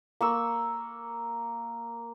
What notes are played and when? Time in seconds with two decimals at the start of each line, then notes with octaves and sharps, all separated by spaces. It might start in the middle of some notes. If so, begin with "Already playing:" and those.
0.21 A#3 C#6 E6